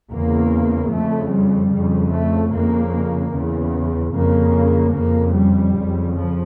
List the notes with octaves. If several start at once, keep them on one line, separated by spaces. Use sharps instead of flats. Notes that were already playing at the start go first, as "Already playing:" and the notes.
E2 C#3 A#3
F2 C#3 A3
G3
F2 C#3
A3
F2 C#3 A#3
E2 C#3
F2 C#3 A#3
F2 C#3 A#3
G3
F2 C#3
F3